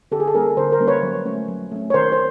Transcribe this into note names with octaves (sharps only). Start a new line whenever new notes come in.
D3 G4 A4
G#4
A4
G3 A#3 C#4 G#4 A#4
D3 A#4 C5
A#4 C5
G3 A#3 C#4
B4 C#5
F#3
A3 C#4
F#3
A3 C#4
C#5
D#3 A#4 C5
C5